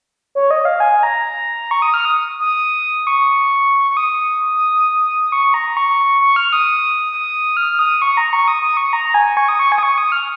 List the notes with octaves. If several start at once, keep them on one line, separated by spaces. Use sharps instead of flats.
C#5
D#5
F5
G#5
A#5
C#6
D#6
F6
D#6
D#6
C#6
C#6
D#6
C#6
A#5
C#6
C#6
F6
D#6
D#6
F6
D#6
C#6
A#5
C#6
D#6
D#6
C#6
A#5
G#5
C#6
D#6
C#6
G#5
D#6
C#6
D#6
F6